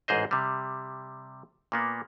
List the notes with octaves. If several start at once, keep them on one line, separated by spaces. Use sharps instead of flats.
A1 G#2 G#4 C5 D#5
C3 G3
A#2 A#3 B3